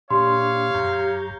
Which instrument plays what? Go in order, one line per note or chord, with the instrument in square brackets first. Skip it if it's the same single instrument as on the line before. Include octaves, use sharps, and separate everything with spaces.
[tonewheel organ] A#2 D4 [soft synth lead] G4 [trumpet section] C#5 F5 [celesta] C6
[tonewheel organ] F#2 A#5 G6